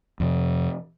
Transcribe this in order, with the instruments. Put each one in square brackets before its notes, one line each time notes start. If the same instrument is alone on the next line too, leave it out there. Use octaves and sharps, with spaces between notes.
[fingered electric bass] F2 C3